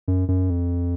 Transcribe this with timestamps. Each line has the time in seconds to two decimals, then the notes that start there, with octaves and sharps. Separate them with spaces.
0.08 F#2
0.28 F#2
0.50 F2